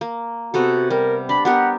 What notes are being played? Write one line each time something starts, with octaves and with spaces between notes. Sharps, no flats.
A#3
C3 B3 F#4 A4
G3 A#4
D4 B5
B3 G4 A#4 F#5